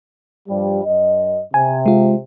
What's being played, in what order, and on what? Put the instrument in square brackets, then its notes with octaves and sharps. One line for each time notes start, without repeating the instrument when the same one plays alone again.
[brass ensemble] G2 F3 G3
F#2 D#5
[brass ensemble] C3 [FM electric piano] G#5
[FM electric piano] G#3 F4